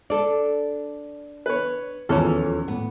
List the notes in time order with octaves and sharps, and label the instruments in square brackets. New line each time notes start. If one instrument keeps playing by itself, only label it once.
[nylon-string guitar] D4 A4 D5
[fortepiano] B4 C#5
[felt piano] D#1 F3 [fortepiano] E2 E3 C#5 [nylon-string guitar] C#4 A4
[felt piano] A2 [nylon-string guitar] B3